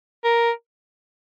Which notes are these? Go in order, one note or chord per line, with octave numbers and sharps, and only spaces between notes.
A#4